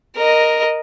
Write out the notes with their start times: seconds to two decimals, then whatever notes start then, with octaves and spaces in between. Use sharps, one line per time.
0.16 A#4 D#5